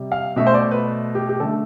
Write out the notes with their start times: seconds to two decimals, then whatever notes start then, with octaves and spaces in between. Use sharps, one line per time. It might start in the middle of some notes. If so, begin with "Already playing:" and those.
Already playing: C3 G3
0.12 F5
0.36 B2 A3 E5
0.47 C5
0.54 D5
0.71 B4
1.15 G4
1.29 G4
1.40 D3 A3 A4